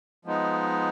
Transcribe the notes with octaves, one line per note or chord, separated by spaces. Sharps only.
F3 G#3 B3 D#4